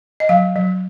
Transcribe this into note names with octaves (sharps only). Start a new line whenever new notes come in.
D#5
F#3 F5
F#3